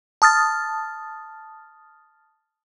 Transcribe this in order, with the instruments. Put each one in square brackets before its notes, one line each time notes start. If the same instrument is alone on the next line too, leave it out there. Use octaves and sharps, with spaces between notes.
[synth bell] A5 D#6 F6 A6